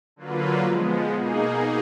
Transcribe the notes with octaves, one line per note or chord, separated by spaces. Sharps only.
D3 F#3 A#3 F4 B4
F3 G#3 B3
B2 A#3 D#4 G#4